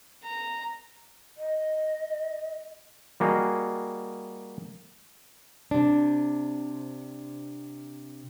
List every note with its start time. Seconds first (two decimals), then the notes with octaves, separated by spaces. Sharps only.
0.24 A#5
1.37 D#5
3.20 G3 A#3 F#4 G#4 D#5 F5
5.71 C3 D4